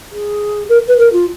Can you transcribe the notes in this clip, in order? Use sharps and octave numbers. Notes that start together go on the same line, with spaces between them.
G#4
A#4
B4
A#4
F4